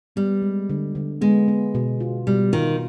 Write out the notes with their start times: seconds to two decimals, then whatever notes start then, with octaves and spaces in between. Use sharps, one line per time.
0.16 G3 B3
0.42 G#3
0.70 D3
0.95 D3
1.21 G#3 B3
1.48 B3
1.75 B2
2.00 F4
2.27 B2 G3
2.53 D#3 F4